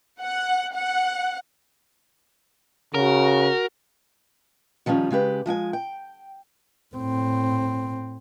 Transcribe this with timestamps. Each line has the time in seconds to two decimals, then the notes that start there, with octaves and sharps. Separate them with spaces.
0.21 F#5
0.73 F#5
2.94 C#3 F#4 A#4
4.86 D#3 F3 G3 A3 C#4
5.11 C#3 G#3 G4 B4
5.46 F3 G#3 G5 G#5
5.73 G5
6.95 A2 C4